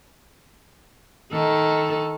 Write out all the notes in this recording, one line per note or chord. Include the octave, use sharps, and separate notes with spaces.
D#3 A4